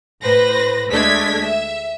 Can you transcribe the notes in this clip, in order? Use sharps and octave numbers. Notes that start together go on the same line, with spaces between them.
A2 B4 C5 A#6
D2 G#3 A3 D4 G#6 B6
E5